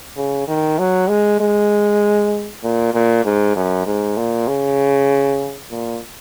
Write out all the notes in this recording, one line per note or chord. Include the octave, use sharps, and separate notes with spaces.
C#3
D#3
F#3
G#3
G#3
A#2
A#2
G#2
F#2
G#2
A#2
C#3
A#2